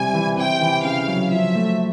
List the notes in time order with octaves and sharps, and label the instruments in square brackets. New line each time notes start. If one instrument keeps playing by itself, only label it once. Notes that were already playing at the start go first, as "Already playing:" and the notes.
Already playing: [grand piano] C3 G3 [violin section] G#5
[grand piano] E3
[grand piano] C3 [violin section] G5
[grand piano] E3
[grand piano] C#3 [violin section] F5
[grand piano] F#3
[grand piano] F3 [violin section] E5
[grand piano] A3